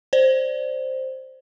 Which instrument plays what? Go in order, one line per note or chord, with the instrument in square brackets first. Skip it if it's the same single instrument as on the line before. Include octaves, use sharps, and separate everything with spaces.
[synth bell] C5 D5